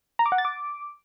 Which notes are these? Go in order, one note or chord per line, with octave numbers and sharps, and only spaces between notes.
A#5
D6
F#5
A6
D6